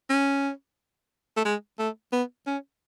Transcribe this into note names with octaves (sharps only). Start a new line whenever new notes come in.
C#4
A3
G#3
A3
B3
C#4